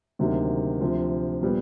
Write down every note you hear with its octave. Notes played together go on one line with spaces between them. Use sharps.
D2 C3 D#3 F#3 A#3
D2 C3 F3
A#2 G3 B3